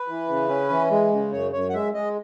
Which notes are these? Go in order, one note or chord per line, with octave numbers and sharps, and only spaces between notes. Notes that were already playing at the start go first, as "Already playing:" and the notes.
Already playing: B4
E3
C#3
C#4
E3
G#3
C#3
F#2 C#5
F#2 C#5
F#5
G#3 E5
G#3 D#5